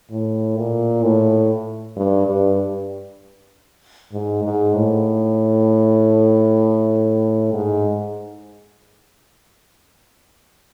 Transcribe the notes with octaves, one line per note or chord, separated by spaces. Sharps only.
A2
A#2
A2
G2
G2
G#2
G#2
A2
G#2